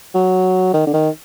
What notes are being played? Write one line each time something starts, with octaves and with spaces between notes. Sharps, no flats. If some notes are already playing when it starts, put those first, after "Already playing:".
F#3
D#3
D3
D#3